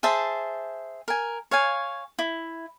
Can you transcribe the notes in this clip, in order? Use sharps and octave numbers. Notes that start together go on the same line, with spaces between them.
G#4 C5 E5 A5
A#4 G#5
C#5 F5 G#5
E4